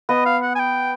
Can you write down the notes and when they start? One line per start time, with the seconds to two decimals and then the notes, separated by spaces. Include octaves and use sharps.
0.09 B3 D#5
0.26 F5
0.42 F#5
0.55 G#5
0.59 G5